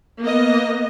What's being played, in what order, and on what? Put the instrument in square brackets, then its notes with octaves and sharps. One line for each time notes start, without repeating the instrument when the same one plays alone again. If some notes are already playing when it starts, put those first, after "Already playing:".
[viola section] A#3 B3 D#5